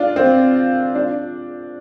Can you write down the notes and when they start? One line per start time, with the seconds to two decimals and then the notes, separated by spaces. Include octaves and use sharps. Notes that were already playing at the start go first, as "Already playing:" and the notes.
Already playing: D4 F4
0.16 C4
0.95 D4